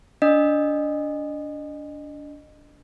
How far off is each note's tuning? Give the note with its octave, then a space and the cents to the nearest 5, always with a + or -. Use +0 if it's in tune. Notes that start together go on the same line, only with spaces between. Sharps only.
D4 -25 D#5 -25